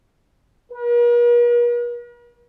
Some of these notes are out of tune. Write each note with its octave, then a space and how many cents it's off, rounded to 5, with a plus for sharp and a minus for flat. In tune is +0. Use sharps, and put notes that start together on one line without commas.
A#4 +45